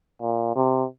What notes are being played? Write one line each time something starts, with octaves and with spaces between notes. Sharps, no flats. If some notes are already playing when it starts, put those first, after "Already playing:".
A#2
C3